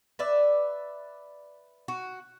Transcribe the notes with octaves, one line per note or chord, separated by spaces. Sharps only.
B4 D5 E5
F#4